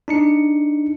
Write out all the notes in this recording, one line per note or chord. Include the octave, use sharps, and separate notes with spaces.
D4 D#4 C#7